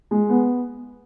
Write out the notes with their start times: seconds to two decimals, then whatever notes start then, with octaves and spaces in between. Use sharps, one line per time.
0.11 G#3
0.30 B3